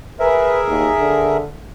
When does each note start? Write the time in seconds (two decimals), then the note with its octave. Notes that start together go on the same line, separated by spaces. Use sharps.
0.19 G#4 A#4 B4 E5
0.67 D#2
0.98 D3